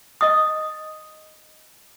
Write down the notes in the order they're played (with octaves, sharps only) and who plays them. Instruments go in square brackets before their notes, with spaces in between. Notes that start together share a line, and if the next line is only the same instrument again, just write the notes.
[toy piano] D#5 D#6